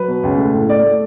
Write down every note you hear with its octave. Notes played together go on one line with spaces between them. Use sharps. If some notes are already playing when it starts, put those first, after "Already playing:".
Already playing: F#3 B4
B2
C#2
A3
A2
A3 D5
A3